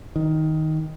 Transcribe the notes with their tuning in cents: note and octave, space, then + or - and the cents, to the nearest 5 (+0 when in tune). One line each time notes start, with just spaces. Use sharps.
D#3 +10